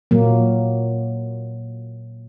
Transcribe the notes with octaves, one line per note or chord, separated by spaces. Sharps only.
A#2 F#3 A#3